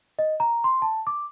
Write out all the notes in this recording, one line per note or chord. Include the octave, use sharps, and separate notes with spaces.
D#5
A#5
C6
A5
D6